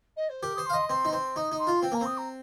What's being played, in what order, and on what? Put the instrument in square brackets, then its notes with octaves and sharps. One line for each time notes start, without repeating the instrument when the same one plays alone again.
[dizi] D#5
C5
[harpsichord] G4 [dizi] A#4
[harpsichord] C5 [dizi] D#6
[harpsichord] F5 [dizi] C6
[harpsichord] D#5
[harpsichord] C4 [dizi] C6
[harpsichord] D#4
[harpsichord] C4 [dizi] C6
[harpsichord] D#4 [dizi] D#6
[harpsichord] D#4
[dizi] C6
[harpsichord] F4
[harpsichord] C4 [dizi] G5
[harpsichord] A#3 [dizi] A#5
[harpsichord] C4 [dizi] D#6
[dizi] A#5